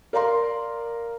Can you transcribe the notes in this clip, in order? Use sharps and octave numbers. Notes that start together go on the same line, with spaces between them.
A#4 D5 F5 A#5 C6